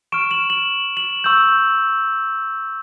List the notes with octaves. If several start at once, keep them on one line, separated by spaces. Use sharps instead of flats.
C#6 F6 D7 E7
E7 F#7
E7 F#7
E7 F#7
C#6 E6 G6